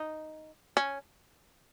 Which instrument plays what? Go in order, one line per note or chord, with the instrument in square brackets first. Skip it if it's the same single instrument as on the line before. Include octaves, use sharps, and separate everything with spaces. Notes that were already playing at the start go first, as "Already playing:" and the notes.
Already playing: [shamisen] D#4
C#4